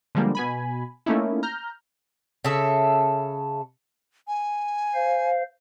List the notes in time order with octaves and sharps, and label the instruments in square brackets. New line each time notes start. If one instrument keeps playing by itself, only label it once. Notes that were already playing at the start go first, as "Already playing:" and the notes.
[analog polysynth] D3 F3 G3 G#3 A#3
B2 G#5 B5
A3 A#3 C#4 D#4 E4
A#5 F6 G6
[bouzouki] C#3 A4 E5
[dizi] G#5
[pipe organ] C5 F5